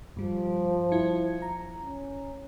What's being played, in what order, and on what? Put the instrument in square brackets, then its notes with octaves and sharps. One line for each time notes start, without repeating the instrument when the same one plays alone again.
[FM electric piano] G2 G3 [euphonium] F3
[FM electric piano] E4 G#6 C#7
A#5
[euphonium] C#4